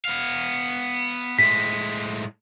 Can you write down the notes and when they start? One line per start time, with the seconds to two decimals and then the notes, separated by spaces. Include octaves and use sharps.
0.05 B3 F5
1.39 A2 G#3 B6